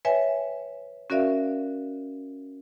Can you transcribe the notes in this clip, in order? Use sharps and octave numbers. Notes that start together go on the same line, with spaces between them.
B4 C#5 E5 G5 G#5
C#4 F#4 A#4 D5 E5 F5